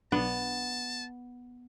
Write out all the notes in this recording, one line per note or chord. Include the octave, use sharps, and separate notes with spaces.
B1 B3 D4 A5